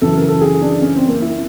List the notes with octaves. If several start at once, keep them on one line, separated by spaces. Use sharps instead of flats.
F#2 C#3 E3 A4
A#4
A4
G#4
D4
C#4
C4
A#3
E4